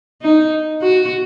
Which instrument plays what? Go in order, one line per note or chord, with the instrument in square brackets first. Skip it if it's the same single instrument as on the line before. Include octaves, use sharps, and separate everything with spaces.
[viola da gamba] D#4
F#4